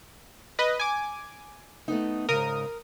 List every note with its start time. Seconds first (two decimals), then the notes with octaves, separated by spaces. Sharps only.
0.59 B4 D#5
0.79 G#5 D6
1.88 A3 B3 D#4
2.29 G#2 C#3 A#4 D#6